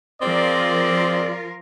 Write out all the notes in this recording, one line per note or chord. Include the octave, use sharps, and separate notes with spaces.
F3 C4 F4 G#4 A#4 D5